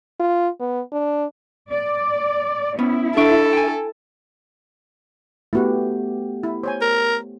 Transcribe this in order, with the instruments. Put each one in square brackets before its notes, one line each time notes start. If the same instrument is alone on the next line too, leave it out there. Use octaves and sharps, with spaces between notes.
[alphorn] F4
B3
D4
[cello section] D5
[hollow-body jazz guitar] B3 C#4 [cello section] E4
[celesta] D4 C#6 D7 [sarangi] A4 [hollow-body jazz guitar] E5 F5
[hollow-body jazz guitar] G5 G#5
[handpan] A3 B3 G4 [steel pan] E4 F#4
[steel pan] E4
C5 C#5 G#5
[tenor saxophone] A#4